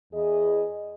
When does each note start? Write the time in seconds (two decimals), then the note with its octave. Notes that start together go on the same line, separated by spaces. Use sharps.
0.13 E2 G#4 D#5